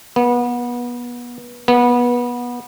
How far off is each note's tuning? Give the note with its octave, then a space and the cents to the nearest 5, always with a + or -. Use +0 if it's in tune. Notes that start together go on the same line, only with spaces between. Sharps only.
B3 -25
B3 -20